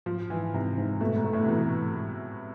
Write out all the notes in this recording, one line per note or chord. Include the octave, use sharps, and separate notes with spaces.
G#2 F3
G#2 E3
G#2 C3
G#2
B2 A3
G#2
A3
A2
C3
B2 E3
G#2
G#3
A2